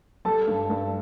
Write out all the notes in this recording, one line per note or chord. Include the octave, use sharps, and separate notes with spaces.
G3 A4 A5
G2
G2